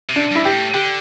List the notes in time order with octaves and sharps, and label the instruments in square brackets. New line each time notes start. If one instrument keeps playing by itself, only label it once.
[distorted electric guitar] C3
[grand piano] D4
[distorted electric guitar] G2
[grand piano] E4
[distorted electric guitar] G2 [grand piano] G4
[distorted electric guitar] A2
[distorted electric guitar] D3 [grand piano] G4